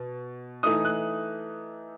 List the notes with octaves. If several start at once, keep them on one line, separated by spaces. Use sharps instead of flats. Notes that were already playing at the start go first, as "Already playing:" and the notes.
Already playing: B2
E3 A3 D#4 D#6
F#6